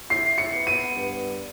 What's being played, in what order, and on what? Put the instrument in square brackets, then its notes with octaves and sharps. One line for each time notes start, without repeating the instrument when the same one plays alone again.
[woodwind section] E4 [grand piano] C7
[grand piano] C#7
[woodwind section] B3
[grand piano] D#7
[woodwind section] G2